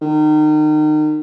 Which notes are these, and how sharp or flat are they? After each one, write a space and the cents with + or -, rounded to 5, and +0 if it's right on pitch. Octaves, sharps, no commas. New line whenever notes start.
D#3 -30